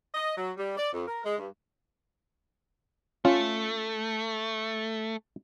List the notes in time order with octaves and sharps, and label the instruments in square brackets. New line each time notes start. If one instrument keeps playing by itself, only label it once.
[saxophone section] D#5
F#3
G3
D5
F2
A#4
G#3
G2
[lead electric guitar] A3 [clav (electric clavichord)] C#4 F4